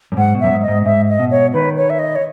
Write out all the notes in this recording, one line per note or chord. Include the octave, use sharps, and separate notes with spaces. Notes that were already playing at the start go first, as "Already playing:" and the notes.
F#2
G#2 F#5
B2
F#2 E5
G#2
D#5
G#2
G#2 E5
D#5
B2
C#5
D#3 B4
C#5
E5
D#5
C#5